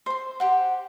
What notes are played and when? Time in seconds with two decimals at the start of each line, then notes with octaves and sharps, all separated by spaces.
0.06 C5 C6
0.40 G4 C5 F#5